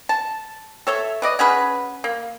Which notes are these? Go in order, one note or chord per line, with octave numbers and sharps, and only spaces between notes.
A5
A4 C#5 E5
B4 D5 D#5
C#4 F#4 G#4 B4
A#3